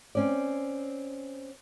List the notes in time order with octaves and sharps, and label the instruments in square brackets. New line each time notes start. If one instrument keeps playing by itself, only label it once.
[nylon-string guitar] C4 C#4 D5